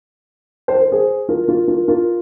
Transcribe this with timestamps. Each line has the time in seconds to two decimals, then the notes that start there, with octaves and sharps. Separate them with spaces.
0.68 C5
0.79 A#4
0.92 G#4 C5
1.29 F4 A#4
1.48 F4 A#4
1.68 F4 A#4
1.88 F4 A#4